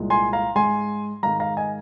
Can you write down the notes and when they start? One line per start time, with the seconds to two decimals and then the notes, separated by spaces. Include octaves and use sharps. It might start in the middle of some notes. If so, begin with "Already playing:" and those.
Already playing: C2 A#2 G#3
0.10 G#5 C6
0.33 F5 A#5
0.55 G#2 G#3 G#5 C6
1.23 G#2 D#3 G#3 F5 A#5
1.40 F5 A#5
1.57 D#5 G#5